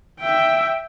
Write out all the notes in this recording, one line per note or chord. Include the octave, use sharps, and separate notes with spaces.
E5 G5